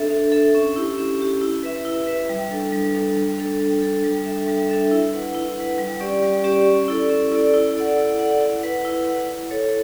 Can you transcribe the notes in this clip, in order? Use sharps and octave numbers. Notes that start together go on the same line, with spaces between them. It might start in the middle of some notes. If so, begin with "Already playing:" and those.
Already playing: D4 A4 E5
D4
A4 E5
C#4
E4 G4
C#4
E4 G4
E4
B4 E5
E4
B4 E5
G3
D4 A4
G3
D4 A4
G3
D4 A4
G3
D4 A4
G3
D4 A4 E5
G3
D4 A4 E5
E4
B4 F#5
E4
B4 F#5
G3
C#4 G4 D5
G3
C#4 G4 D5
C#4
E4 A4 D5
C#4
E4 A4 D5
E4
A4 D5 F#5
E4
A4 D5 F#5
E4
B4 F#5
E4
B4 F#5
E4
A4 C#5